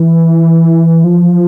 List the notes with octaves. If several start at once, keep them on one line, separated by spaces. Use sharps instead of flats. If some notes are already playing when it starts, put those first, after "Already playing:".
Already playing: E3
F3